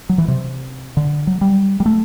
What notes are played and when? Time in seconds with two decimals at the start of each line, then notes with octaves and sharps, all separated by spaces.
0.09 F#3
0.18 E3
0.28 C3
0.97 D3
1.27 F#3
1.41 G3
1.80 G3
1.86 A3